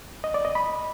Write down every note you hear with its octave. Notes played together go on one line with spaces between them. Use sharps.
D#5
D5
D#5
B5